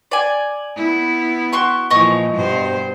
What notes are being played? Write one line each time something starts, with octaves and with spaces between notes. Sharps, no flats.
D5 G#5
B3 E4
F#4 C6 C#6
A#2 E3 F3 D#5 C#6
G2 B2 C5